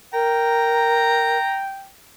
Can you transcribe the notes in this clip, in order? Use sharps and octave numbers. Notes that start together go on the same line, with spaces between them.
A#4 G5 A#5